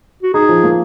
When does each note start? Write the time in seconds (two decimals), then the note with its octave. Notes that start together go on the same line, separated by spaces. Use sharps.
0.23 F#4
0.34 D#4 G#4
0.49 F3
0.64 A#3